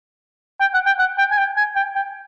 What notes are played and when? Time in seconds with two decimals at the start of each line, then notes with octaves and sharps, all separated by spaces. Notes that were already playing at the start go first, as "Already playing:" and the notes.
0.60 G5
0.74 F#5
0.86 G5
0.99 F#5
1.18 G5
1.31 G#5
1.38 G5
1.57 G#5
1.76 G5
1.95 G5